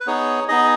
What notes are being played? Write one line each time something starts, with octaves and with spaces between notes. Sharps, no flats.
B4
B3 D#4 G#4 C#5
B3 D#4 G#4 D#5